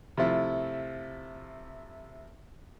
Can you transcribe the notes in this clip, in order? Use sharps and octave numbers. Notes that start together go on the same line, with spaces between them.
C3 F3 A3 E4